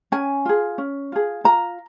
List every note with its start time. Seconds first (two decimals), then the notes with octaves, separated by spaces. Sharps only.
0.12 C#4 G#5
0.45 F4 G#4
0.78 C#4
1.12 F4 G#4
1.44 F4 A#5